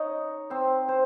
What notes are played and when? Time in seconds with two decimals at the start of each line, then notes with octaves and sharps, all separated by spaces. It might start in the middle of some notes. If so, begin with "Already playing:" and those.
Already playing: D#4 C#5 D#5
0.50 C4 C5
0.89 C5